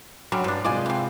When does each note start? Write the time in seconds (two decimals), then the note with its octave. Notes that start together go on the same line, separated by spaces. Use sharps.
0.32 D3 F#3 G3 C#4
0.44 G2 F3 D4
0.64 C3 G#3 F4 D5 D#5 G#5
0.86 E3 C4